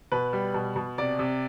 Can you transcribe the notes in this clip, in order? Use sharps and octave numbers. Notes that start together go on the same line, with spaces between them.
B2 B4
G3
B2
B2
C3 D5
C3